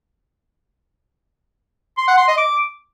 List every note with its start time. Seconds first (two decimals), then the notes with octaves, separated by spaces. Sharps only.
1.98 C6
2.08 F#5
2.18 C6
2.28 D#5
2.38 D6